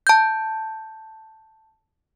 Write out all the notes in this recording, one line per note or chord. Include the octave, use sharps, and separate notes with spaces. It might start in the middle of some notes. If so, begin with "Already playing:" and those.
A5 G6